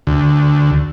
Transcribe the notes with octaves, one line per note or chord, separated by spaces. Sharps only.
D2